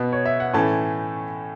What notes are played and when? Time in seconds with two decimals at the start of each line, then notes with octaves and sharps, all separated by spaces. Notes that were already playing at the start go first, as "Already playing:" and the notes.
Already playing: B2 B3
0.13 C#5
0.25 E5
0.40 F#5
0.53 A2 E3 A3 C#4 A5